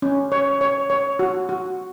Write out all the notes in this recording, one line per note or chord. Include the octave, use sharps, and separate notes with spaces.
C#4
C#5
C#5
C#5
F#4
F#4